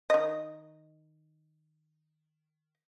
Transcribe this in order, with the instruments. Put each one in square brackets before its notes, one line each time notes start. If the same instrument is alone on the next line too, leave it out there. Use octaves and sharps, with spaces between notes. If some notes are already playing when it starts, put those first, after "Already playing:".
[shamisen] D#3 D#5